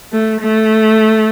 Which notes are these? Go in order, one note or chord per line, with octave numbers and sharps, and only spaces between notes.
A3
A3